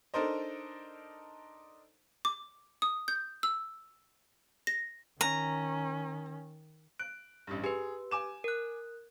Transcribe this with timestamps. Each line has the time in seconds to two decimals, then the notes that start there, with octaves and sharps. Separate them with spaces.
0.14 D4 D#4 A4 A#4 C5 D#5
2.25 D6
2.82 D#6
3.08 G6
3.43 E6
4.67 A#6
5.21 D#3 C#4 A#5
6.99 F#6 D7
7.47 A1 G2
7.64 G4 G#4 B4
8.11 G#5 D6 E7
8.44 A#4 F#6